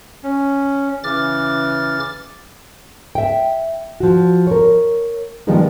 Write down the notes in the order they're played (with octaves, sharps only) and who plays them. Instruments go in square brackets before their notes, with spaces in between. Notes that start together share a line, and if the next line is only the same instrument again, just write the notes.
[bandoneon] C#4
[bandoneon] C#3 E3 [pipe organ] D6 F6 A6
[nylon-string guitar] E5 G5
F3 F#4
A#4 C#5
D#3 F3 G3 G#3 B3 D#4